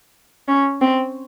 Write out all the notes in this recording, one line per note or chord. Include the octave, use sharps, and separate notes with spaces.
C#4
C4